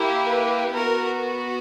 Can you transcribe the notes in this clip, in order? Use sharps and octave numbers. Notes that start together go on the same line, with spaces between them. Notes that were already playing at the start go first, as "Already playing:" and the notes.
Already playing: A#3 E4 G4
B4
B3 F#4 A#4